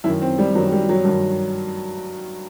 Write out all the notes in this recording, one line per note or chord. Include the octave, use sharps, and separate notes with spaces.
F#2 D#3 E4
C4
G3
F#2 D#3 F#3
G3
F#3
G2 D#3